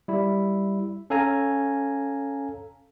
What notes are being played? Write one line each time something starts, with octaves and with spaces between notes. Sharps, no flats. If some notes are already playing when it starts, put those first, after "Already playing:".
G3 E4
C#4 A4 F5 G#5 A#5